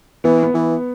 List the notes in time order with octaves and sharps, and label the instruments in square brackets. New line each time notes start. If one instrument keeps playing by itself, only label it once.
[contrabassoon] E3 [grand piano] B3
[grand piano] B3
[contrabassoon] E3